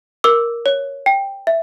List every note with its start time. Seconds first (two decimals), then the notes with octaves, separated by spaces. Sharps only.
0.24 A#4 D6 E6
0.66 C#5
1.06 G5
1.47 E5